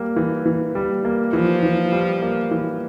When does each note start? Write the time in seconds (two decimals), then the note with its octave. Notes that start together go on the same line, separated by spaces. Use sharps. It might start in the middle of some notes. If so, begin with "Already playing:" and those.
Already playing: G3 A#3
0.16 E3
0.46 E3
0.75 G3
1.05 A#3
1.33 E3 F3
1.63 E3
1.92 G3
2.22 A#3
2.51 E3